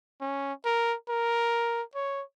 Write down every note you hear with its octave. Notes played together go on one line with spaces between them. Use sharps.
C#4
A#4
A#4
C#5